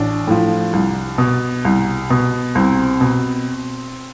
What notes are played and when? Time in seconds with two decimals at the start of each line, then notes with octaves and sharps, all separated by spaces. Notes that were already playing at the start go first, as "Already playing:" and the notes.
Already playing: A1 D4
0.27 A2 F3
0.73 C2
1.18 B2
1.65 C2
2.10 B2
2.55 C2 C4
3.01 B2